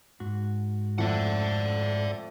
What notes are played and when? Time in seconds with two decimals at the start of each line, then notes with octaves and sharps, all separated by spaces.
0.20 G#2 F#4
0.98 F2 A2 D5 F#5